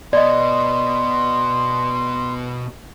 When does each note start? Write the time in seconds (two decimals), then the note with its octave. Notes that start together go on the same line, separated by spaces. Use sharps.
0.13 B2 B3 D5 D#5 C6